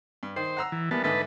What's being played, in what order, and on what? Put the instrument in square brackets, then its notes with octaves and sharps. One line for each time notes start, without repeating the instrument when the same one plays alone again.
[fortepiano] G2
[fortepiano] D#3 [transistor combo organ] C5
[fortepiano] F#5 A#5 E6
[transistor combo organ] E3
[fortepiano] E3 G3 A#3 [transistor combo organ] B3 A5
[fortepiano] G#2 D3 E3 [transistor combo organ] B4 A5